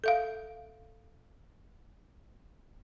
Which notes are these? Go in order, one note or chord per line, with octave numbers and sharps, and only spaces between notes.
A4 E5 F5